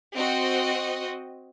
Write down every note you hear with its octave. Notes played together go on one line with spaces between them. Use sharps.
C4 F#4 D#5